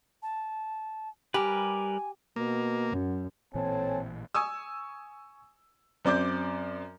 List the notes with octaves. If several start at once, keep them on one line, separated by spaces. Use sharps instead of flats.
A5
G3 G4 A#4 B4 G#5
B2 A#3
F#2
A1 A#2 E3 C4 A4 C#5 G#5 A5
G#5 C#6 D#6 E6
F#2 C4 D5 D6 G6